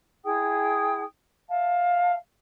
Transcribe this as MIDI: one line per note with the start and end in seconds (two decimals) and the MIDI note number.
0.24 1.03 64
0.24 1.03 68
0.24 1.03 79
0.24 1.03 87
1.48 2.13 76
1.48 2.13 77
1.48 2.13 81